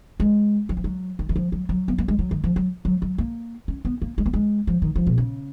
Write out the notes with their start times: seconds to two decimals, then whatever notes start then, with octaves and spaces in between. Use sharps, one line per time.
0.20 G#3
0.69 F#3
0.77 F3
0.84 F#3
1.19 D#3
1.29 D#3
1.36 F3
1.52 F#3
1.69 F#3
1.88 B3
1.98 A#3
2.08 G#3
2.19 F#3
2.31 D#3
2.44 F3
2.56 F#3
2.85 F#3
3.02 F#3
3.18 A#3
3.68 C#4
3.85 B3
4.02 A#3
4.18 G#3
4.26 A#3
4.33 G#3
4.67 F3
4.82 D#3
4.96 F3
5.07 B2
5.18 C#3